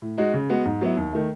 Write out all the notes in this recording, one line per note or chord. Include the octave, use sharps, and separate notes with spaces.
A2
G#3 D#4 F#4
C#3
G#3 B3 F#4
G#2
F#3 B3 E4
D#2
D#3 A3